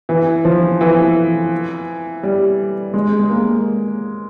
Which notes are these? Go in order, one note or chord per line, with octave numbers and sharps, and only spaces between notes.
E3
F3
E3
G3
G#3
G#3
A#3